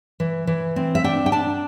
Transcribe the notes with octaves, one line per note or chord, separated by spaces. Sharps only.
E3
E3
C4
E5
D4 G5
G5
D4 A5